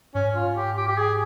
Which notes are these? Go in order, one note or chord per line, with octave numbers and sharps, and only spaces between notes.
G#2 C#4
F4
G4
G4
G4
G#4